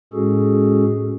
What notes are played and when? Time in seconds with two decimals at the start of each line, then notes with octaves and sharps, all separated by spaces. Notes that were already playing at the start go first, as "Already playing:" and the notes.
0.13 A2 G#3 C#4 F#4 G#4 A4